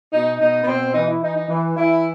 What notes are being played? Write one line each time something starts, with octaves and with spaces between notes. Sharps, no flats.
B2 D#4
B2 D#4
B3
B2 C4
E3 D#4
E4
E3 D#4
D#4
E3
E3 E4